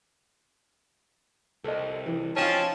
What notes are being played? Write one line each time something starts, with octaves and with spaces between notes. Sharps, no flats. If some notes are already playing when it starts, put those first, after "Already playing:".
C2 A4 D#5
E3
F3 C4 C#4 D#4 F5 A5